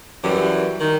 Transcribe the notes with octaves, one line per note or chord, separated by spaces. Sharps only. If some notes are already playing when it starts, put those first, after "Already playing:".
F#2 E3 G3
D#3